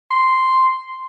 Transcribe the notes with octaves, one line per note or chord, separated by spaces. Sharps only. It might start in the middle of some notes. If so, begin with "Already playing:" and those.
C6